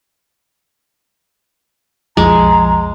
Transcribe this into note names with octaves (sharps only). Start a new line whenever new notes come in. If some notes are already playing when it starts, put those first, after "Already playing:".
B1 F2 F3 G#3 A#5